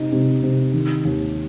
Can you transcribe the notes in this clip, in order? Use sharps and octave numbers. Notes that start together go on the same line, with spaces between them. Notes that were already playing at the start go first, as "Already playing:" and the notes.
Already playing: C3 D#4
C3
C3
D#3
D#2